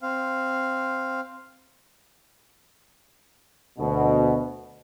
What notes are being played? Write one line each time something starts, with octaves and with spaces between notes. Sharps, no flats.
C4 F5
D2 B2